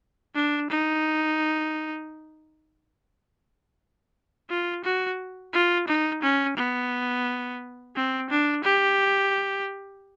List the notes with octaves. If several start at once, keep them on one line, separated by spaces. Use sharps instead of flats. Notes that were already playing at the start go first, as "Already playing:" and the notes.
D4
D#4
F4
F#4
F4
D#4
C#4
B3
C4
D4
G4